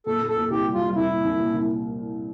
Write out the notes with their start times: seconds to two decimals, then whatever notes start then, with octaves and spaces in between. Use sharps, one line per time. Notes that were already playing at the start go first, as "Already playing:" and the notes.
0.06 A#2 A4
0.21 A#2
0.29 A4
0.36 A#2
0.50 C2 G4
0.65 G3
0.73 F4
0.80 G3
0.95 C2 E4
1.10 A#2
1.24 C2
1.39 A#2
1.53 C2